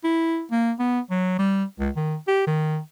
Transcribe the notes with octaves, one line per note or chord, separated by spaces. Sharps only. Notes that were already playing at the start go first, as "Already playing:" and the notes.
E4
A#3
B3
F#3
G3
C#2
D#3
G4
D#3